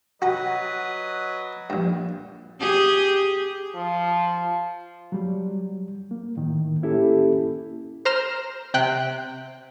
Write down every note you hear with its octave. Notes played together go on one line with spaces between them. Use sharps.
F#3 F#4 B4 D#5 A#5
A#1 G2
G4 G#4
F3
F#3 G3
A#3
A2 D#3
A#3 C#4 E4 G4 A4
C5 A#5 F6 E7
C3 G5 F#6